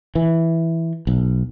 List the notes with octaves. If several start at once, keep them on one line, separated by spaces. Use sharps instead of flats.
E3
B1